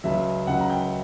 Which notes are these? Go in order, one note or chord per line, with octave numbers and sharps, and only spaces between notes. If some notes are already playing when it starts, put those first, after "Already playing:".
C#2 C#3 F#3 E5
C#2 C#3 F#3 F#5
A#5
G5